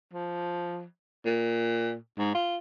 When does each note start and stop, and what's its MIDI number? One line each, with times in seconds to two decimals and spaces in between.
0.14 0.83 53
1.25 1.95 46
2.18 2.33 44
2.35 2.57 65